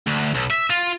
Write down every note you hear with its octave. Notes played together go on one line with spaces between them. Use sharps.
D2
B1
E5
F4